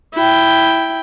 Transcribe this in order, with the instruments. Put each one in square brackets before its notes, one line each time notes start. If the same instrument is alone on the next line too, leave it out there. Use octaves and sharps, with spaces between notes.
[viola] E4 G5